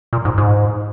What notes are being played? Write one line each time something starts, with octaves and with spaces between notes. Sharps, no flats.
A#2
G#2
G#2